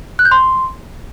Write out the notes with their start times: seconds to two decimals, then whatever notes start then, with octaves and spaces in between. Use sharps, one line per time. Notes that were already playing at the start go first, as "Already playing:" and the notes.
0.19 F#6
0.25 G6
0.32 C6